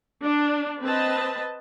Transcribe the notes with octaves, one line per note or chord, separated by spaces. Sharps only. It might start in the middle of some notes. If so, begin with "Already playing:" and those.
D4
C4 B4 D#5 A5